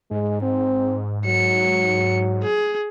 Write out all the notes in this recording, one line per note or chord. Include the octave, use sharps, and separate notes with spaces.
G#2 G#3
C4
F#3 C#7
G#4